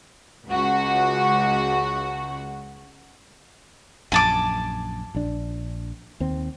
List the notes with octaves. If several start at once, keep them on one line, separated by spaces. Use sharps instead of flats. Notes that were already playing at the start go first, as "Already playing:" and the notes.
C#2 F#4
A#1 F#2 G#5 A5 D6
A#1 D4
D#2 C4